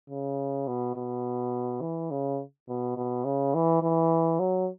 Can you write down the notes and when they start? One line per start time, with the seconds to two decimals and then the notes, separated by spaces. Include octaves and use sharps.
0.10 C#3
0.67 B2
0.96 B2
1.81 E3
2.11 C#3
2.68 B2
2.96 B2
3.25 C#3
3.54 E3
3.82 E3
4.39 F#3